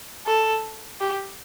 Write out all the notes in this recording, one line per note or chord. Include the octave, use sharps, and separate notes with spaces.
A4
G4